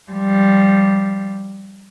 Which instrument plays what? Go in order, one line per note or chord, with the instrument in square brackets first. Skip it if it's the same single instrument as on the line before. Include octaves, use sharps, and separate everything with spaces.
[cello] F3 G3